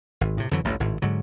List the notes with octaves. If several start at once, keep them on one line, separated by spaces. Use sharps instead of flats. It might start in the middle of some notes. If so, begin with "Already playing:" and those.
G#1
A2 C3
F2 D3 E3 F#3
A1 D2 G2
G#1 A2
G#2 D3 F#3